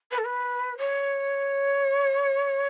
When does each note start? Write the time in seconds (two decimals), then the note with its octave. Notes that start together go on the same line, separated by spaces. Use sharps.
0.11 B4
0.18 A4
0.24 B4
0.77 C#5